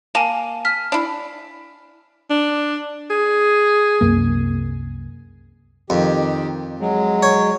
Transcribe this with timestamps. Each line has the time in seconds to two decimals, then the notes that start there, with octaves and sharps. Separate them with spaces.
0.15 A#3 G#5 A5
0.65 F6 B6
0.92 D4 E4
2.30 D4
3.10 G#4
4.01 C2 F#2 A#3
5.90 F2 D#3 G4
6.80 F#3 G#3
7.23 C#5